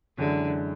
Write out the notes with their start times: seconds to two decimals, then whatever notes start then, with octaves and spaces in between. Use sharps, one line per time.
0.18 F#2 D3 E3 G#3